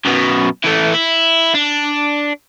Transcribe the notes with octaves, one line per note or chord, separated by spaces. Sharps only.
F#2 B2
E3 A3
E4
D4